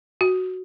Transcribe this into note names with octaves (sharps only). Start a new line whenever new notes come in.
F#4